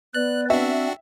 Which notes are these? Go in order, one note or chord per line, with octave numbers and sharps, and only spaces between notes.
B3 B4 D5 F#6
C4 D4 F#4 E5